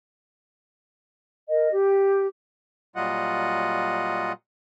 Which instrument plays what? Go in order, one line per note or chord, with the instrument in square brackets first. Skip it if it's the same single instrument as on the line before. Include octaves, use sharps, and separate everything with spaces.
[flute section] A#4 D#5
G4
[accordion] A#2 F#3 G3 F4 D#5 F#5